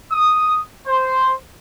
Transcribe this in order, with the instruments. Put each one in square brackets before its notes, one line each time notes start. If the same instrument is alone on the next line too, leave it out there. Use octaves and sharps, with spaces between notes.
[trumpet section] D#6
C5